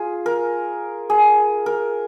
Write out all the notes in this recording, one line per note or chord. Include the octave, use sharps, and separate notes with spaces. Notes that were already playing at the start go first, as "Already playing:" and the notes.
Already playing: F4 G#4
A#4
G#4
A#4